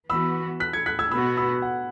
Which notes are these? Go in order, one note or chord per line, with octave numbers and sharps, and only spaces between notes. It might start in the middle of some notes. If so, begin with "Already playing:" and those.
E3 B3 F#4 B5 E6
F#6 B6
G#6 C#7
F#6 B6
E6 G#6
B2 B3 F#4 B5 E6
B5 E6
F#5